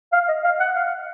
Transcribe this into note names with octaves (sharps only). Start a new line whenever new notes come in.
F5
D#5
F5
F#5
F5